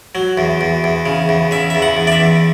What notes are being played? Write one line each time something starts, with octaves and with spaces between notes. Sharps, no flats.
F#3
E2
E2
E2
C#3
E2
C#3 E5
E2 E5
F#5
E2
D5
E5
E2